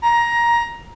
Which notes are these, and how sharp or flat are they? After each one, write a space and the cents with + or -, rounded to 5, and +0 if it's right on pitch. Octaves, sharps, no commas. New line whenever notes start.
A#5 +15